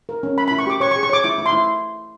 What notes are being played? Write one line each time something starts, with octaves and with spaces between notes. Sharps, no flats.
A#4
C#4
C#4 B5
B5
E4
C#6
G4 D6
C#5 C#6
C#6
G#4
C#6
C#5 D6
E4 D6
E4
C6
E4